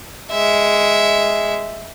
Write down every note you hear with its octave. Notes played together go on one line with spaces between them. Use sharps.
G#3 E5